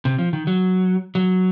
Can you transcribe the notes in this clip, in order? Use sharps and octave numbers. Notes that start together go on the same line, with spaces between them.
C3
F3
D#3
F#3
F#3